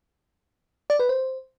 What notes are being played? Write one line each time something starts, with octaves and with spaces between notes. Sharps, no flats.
D5
B4
C5